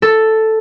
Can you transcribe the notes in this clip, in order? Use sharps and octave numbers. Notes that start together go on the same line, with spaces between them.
A4